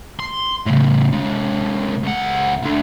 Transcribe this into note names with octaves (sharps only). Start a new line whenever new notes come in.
C6
A2 C#3
C3 G#3
C#2 F#5
D2 D3